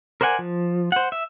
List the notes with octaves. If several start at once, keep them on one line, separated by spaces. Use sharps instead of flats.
A#4 C5 D5 F#5 G#5
F3
C5 F#5
E5